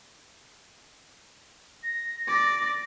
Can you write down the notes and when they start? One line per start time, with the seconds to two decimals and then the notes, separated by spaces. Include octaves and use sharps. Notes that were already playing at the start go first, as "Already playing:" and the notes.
1.83 A#6
2.28 D5